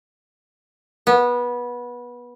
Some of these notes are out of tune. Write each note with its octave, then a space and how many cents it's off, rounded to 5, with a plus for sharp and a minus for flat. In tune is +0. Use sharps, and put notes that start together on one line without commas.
B3 -20